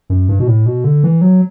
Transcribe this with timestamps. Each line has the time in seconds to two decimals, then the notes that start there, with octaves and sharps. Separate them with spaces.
0.10 F#2
0.29 G2
0.39 B2
0.48 A2
0.66 B2
0.84 D3
1.04 E3
1.21 F#3